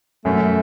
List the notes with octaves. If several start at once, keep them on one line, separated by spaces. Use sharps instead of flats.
F#2 A3